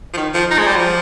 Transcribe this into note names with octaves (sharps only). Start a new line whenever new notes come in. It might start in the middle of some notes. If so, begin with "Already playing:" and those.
F3
D#3
F3
D#4
G#3
G3
F3